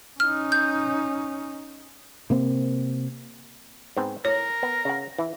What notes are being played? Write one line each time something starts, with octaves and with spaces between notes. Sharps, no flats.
C#4 D#4 F6
G6
C3 A#3 C4
G#2 B3 C4
A2 A#4 C#5
B3
C#3 F#5
E3